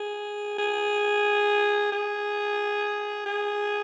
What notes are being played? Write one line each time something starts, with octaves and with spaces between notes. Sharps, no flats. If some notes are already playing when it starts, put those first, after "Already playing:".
Already playing: G#4
G#4
G#4
G#4